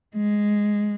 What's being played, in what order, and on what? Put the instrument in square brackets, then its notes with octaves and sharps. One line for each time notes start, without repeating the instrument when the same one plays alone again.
[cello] G#3